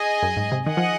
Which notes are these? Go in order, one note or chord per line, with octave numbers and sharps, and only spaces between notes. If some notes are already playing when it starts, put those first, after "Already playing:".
Already playing: G#4 D#5 G#5
F#2
G#2
C3
D#3 G#4 D#5 F#5
F3